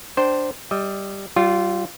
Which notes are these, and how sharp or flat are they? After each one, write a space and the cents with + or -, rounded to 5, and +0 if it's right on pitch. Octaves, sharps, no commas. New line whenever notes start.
D4 +0 C5 +0 G5 -15
G3 +0 D#5 +30
G3 -40 F4 -5